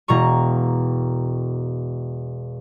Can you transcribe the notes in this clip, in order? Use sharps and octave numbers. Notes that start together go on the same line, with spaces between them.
E1 B2 A#5 C#6